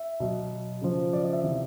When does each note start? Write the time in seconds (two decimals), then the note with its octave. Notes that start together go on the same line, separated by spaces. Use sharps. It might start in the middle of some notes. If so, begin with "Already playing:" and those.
Already playing: E5
0.20 B2 F#3
0.82 C#3 F3
1.13 D5
1.23 D#5
1.33 E5
1.44 C3 E3 E5